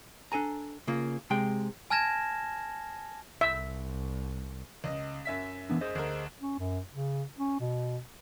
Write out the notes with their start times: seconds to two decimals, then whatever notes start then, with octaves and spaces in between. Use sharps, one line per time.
0.32 D4 A4 G#5 A#5
0.87 C#3 A#3 F4
1.30 C3 G#3 G5
1.90 G#5 A5 F6 G#6 A#6 E7
3.41 C2 E5
4.84 C#2 D#5
5.25 F#2 E5 B6
5.70 E3 B3 D4
5.81 G#4 C5 D#5
5.95 D2 A#4
6.41 C#4
6.59 F#2
6.93 C#3
7.39 C#4
7.60 B2